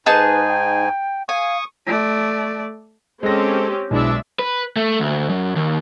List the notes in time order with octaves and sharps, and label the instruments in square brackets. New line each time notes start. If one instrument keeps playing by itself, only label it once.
[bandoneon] G#2 G#5 [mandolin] D#4 G#4 A5 [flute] B4
[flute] G5
[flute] F5 [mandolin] G#5 [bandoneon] C#6 D#6
[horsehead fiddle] A3 D5
[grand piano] G#3 A#6 [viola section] C4 C#4 G4 [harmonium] A4 C5
[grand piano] B1 [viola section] G#3 D4 E5 [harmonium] E4
[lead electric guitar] B4
A3
D2
F#2
D#2